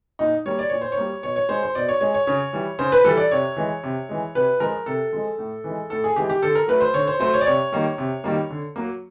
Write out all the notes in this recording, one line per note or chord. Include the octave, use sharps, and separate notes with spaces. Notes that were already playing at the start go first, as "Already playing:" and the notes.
A#2 D#4
G3 A#3 C#5
D5
A#2 C#5
C5
C#5
G3 A#3
B2 C#5
C#5
G#3 C5
C5
B2 D5
C#5
G#3 C#5
C#5
C#3 C#5
E3 G3
C#3 C5
B4
E3 G3 A4
D5
C3 C#5
E3 G#3
C3
E3 G#3
C3 B4
F3 G#3 A#4
C3 A4
F3 G#3
A2
E3 G#3
A2 A4
G#4
E3 G#3 G4
G4
D3 A4
A#4
F#3 A3 B4
C5
D3 C#5
C5
F#3 A3 C5
C#5
D5
C3 C#5
D#3 G3 A#3
C3
D#3 G3 A#3
D3
F#3 A#3